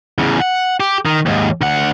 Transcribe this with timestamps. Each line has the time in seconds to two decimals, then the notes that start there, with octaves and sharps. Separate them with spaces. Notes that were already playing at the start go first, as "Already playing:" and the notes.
0.18 E2 C#3
0.40 F#5
0.80 G4
1.06 D#3
1.26 D#2 G#2
1.61 D2 F#5